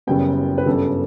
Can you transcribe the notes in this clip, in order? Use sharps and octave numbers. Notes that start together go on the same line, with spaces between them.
F#1 F#2 C#3 G3 B3 G5
B4
G1 F#2 C#3 G3 B3 A4